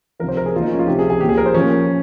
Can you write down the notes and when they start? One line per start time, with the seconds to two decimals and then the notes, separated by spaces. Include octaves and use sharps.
0.19 F3 A#4
0.23 C3
0.29 C5
0.37 A#4
0.46 G#4
0.54 A#2 F3 F4
0.62 D#4
0.71 C#4
0.79 F4
0.87 C3 F3 G4
0.99 G#4
1.10 G#4
1.21 A#2 F3 G4
1.29 G#4
1.38 A#4
1.46 C5
1.54 A#2 F3 C#4